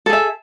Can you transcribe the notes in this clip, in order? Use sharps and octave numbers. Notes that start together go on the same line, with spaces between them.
G#4 A4 E5